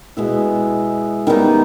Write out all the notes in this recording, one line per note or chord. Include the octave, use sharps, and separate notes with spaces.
B2 G#3 B3 E4
D#3 G3 B3 D#4